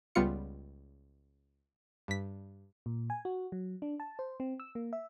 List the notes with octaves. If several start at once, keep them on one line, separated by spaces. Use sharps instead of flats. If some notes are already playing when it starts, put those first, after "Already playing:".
C#2 G3 B3 F4 C#7
G2 B6
A#2
G#5
F#4
F#3
D4
A5
C5
C4
E6
A#3
E5